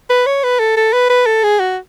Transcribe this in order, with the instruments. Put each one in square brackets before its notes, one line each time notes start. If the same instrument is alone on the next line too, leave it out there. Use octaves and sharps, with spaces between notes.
[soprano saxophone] B4
C#5
B4
A4
A4
B4
B4
A4
G#4
F#4